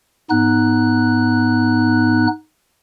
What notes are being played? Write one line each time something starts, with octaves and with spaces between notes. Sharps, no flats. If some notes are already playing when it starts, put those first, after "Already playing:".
G#2 B3 D#4 F#6